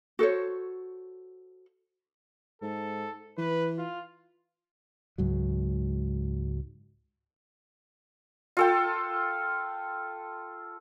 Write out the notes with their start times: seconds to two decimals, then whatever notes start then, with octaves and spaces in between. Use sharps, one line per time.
0.19 F#4 A4 C5 C#5
2.62 G#2 A4
3.38 E3 B4
3.78 F4
5.18 C#2 G#2 F#3
8.57 F4 A4 G5